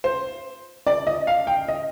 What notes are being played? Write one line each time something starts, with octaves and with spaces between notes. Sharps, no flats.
C5
D5
D#5
F5
G5
D#5